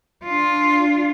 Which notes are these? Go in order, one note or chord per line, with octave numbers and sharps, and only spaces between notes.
D4 F4